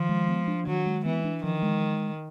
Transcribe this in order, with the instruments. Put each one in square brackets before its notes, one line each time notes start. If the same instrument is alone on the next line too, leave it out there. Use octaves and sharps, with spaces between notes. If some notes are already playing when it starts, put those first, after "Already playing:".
Already playing: [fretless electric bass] D#3 [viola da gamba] F3
[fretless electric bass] G#3
B3
D4
[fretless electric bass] D#3 [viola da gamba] F#3
[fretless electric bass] G#3
[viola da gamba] E3 [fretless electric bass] B3
[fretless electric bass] D4
[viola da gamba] D#3 [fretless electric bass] F3
[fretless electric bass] G#3